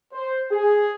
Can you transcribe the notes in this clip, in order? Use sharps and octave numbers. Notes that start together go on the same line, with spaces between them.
C5
G#4